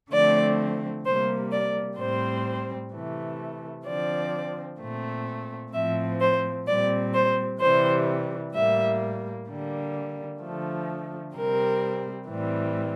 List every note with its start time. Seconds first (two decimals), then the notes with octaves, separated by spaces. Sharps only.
0.11 D3 F3 A3 C4 D5
1.05 C3 G3 A#3 C5
1.51 D5
1.98 A2 G3 C4 C5
2.93 C3 E3 A3
3.86 D3 F3 C4 D5
4.80 A#2 A3 C4
5.73 A2 F3 C4 E5
6.21 C5
6.66 A#2 G3 C4 D5
7.14 C5
7.61 C3 E3 G3 C5
8.54 A2 G3 A#3 E5
9.48 D3 G3 A#3
10.42 D3 F3 A3
11.35 C3 G3 C4 A#4
12.29 A2 E3 G3 C4